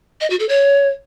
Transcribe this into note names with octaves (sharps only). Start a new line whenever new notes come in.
D#5
F#4
A4
C#5